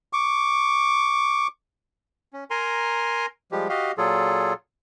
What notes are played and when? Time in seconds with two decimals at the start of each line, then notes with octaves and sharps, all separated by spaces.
0.13 C#6 D6
2.33 C#4
2.51 A#4 G#5 A#5 C6
3.52 F3 G3 G#3 G4
3.69 F#4 G4 D#5 F5
3.98 A#2 F#3 F4 G#4 A4